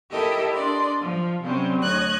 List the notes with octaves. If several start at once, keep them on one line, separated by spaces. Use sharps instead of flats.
E4 G4 A4 A#4 D#5 E5
D4 D5 D#5 C6
F3
C3 F#3 G3 C4 C#4
D2 C#5 D#5 F#6 G#6